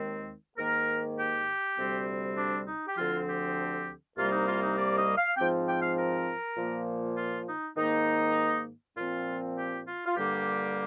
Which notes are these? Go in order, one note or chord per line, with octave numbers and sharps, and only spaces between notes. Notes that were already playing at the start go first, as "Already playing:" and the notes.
Already playing: D#2 D#3 G#3 C4
G#2 D#3 A#3 A#4
G4
D2 C3 G3 C4
D4
D#4
G4
D2 D3 F3 C4 F4
G4
C2 C3 G3 A#3 F4
D#4
F4
D#4
D5
D#5
F5
G#2 F3 C4 G5
G5
F5
A#4
A#2 F3 A#3
F4
D#4
G#2 D#3 A#3 D#4
A#2 F3 C4 F4
G4
F4
F4
G2 D3 G3 A#3 G4